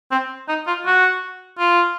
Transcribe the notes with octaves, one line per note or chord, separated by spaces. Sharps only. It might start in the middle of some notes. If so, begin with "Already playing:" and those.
C4
D#4
F4
F#4
F4